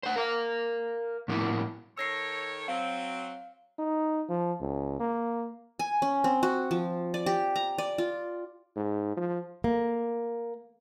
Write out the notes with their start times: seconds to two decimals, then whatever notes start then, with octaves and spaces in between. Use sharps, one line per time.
0.03 C5 F#5
0.16 A#4 F5
1.28 A2 F3 A#3 B3 E4
1.98 D#3 A4 C#5 E6 A#6 C7
2.68 F#3 C4 F5
3.79 D#4
4.29 F3
4.61 C#2
5.00 A#3
5.79 G#5
6.02 C#4
6.24 C4
6.43 F#4
6.71 F3
7.14 D5
7.26 G4
7.56 A#5
7.78 D5
7.98 F4
8.76 G#2
9.17 F3
9.64 A#3